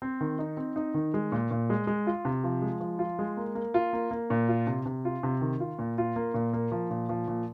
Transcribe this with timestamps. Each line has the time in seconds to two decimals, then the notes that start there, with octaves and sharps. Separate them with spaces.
0.02 C4
0.21 D#3
0.39 D#4
0.57 C4
0.76 D#4
0.94 D#3
1.14 G#3
1.32 A#2
1.51 A#2
1.70 G#3
1.87 G#3
2.07 F4
2.25 C3
2.44 F3
2.62 G#3
2.81 F3
2.99 F4
3.19 G#3
3.37 A#3
3.55 A#3
3.74 F4
3.93 A#3
4.11 A#3
4.30 A#2
4.49 F4
4.67 C3
4.86 C3
5.05 F4
5.23 C3
5.41 D#3
5.60 F4
5.79 A#2
5.98 F4
6.16 A#3
6.34 A#2
6.53 A#3
6.72 F3
6.90 A#2
7.09 F3
7.28 A#2